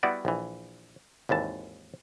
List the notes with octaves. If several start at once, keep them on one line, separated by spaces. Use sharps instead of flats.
G3 B3 E4 F#4 D5
A#1 E3
G#1 D#2 E3 A5